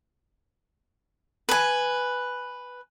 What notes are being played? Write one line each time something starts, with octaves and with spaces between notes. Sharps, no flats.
B4 G#5